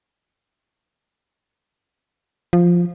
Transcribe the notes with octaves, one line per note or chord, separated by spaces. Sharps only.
F3